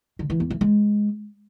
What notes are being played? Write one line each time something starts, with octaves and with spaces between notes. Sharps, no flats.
D3
E3
E2
E3
G#3